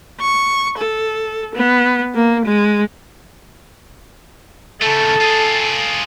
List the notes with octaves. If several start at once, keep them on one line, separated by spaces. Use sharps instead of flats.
C#6
A4
B3
A#3
G#3
C#3 A3 A4
F4 G#4